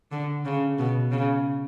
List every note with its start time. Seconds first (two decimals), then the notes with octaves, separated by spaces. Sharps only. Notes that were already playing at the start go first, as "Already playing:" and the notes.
0.12 D3
0.45 C#3
0.79 B2
1.12 C#3